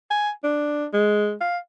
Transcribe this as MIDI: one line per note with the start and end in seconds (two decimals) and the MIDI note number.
0.11 0.31 80
0.44 0.86 62
0.93 1.35 56
1.41 1.58 77